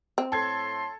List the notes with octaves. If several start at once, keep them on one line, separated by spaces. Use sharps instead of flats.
C4
A2 A3 A4 C6 G#6